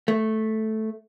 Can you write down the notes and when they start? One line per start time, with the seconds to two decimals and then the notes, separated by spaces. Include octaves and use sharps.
0.08 A3